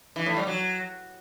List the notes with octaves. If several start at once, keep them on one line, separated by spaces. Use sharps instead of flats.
E3
A2
G3
F#3